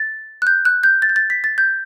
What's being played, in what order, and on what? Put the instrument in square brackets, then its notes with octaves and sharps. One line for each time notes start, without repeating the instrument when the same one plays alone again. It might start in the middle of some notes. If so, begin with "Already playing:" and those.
Already playing: [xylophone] A6
F#6
G6
F#6
G6
A6
G6
A6
B6
A6
G6